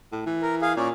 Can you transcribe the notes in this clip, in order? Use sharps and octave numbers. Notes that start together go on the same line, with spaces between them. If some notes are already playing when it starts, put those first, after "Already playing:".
A2
E3
A#4
G#4 F5
A#2 C#4 D5